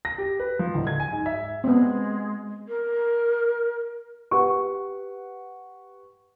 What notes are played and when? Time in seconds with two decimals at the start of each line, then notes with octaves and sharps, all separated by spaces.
0.05 A#6
0.18 G4
0.40 B4
0.59 F3
0.74 D1
0.87 G#6
1.00 G#5
1.12 G#2
1.26 E5
1.64 G#3 B3 C4
2.68 A#4
4.31 G4 B4 F#5 C#6